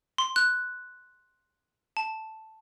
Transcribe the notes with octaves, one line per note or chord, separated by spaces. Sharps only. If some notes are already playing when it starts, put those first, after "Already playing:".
C6
F#6
A5